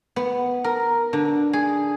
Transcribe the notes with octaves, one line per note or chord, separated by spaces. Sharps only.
B3
A#4
D3
G#4